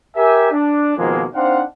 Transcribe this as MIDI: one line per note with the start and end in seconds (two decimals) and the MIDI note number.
0.16 0.50 67
0.16 0.50 70
0.16 0.50 76
0.16 0.50 80
0.52 0.93 62
0.98 1.24 41
0.98 1.24 47
0.98 1.24 51
0.98 1.24 53
0.98 1.24 56
0.98 1.24 58
1.34 1.62 60
1.34 1.62 62
1.34 1.62 63
1.34 1.62 72
1.34 1.62 77
1.34 1.62 78